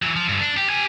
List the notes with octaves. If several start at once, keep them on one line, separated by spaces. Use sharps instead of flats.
E3 F#3
F3
G2 D3
D4
G4
G4 G#5